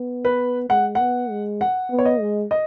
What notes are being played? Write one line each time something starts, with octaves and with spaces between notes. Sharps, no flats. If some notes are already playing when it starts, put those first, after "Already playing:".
Already playing: B3
B4
G#3 F#5
B3 F#5
G#3
F#5
B3
C#5
D#5
G#3
D#5